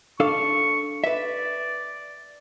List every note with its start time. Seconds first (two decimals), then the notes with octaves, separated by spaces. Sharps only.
0.20 D4 A4 F5 C#6
1.04 B4 D5 E5